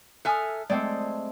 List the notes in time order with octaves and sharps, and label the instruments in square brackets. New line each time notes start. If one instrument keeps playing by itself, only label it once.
[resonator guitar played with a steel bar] A4 E5 G#5 [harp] D#6 F6 F#6
[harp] G#3 A3 C4 [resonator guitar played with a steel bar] D5